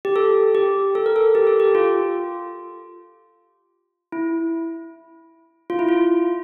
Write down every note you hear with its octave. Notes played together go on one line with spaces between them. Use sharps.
G4
A4
G4
A4
A#4
A4
G4
A4
G4
F4
E4
F4
E4
F4